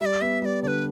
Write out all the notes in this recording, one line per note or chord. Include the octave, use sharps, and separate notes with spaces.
G3 D5 E5
B3 E5
G3 D5 E5
D3 D5
B4